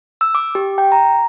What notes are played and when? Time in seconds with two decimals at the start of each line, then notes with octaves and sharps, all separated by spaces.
0.21 E6
0.35 D6
0.55 G4
0.78 G5
0.92 A#5